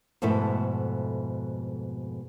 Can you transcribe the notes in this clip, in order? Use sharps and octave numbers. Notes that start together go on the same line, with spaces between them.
F2 G#2 B2 A3 E4 A4